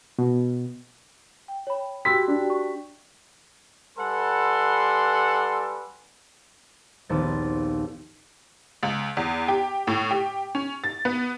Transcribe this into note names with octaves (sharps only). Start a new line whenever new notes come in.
B2
G5
C#5 B5
F#4 G4 G5 B5 C6 E6 B6
D4
C#6
G3 A4 B4 F#5 G#5 C6
A#1 D#2 B3 C4 A6
C#2
E2
G4
A2
G4
C#4
A6
B3